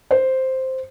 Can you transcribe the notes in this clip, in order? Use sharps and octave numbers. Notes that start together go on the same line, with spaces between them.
C5